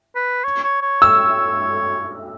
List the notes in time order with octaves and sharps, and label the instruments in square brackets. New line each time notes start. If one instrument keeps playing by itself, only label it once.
[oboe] B4
C#5
C#5
C#5
[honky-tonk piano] E6